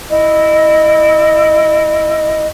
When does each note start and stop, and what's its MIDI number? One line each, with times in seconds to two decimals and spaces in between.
0.10 2.45 64
0.10 2.45 75